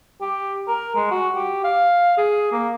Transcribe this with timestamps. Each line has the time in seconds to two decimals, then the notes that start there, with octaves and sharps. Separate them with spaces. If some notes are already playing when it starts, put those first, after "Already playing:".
0.21 G4
0.68 A#4
0.96 G#3
1.11 F#4
1.35 G4
1.64 F5
2.18 G#4
2.52 A#3